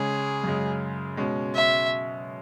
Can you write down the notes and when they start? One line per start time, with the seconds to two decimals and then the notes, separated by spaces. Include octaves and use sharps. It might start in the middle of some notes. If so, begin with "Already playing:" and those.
Already playing: C#3 G#3 C#4 G#4
0.44 F#2 C#3 G#3
1.17 B2 G#3 C#4
1.54 E5